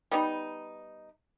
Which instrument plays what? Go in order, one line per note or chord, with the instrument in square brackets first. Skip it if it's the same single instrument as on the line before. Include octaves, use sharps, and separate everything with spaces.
[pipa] G3 B3 D#4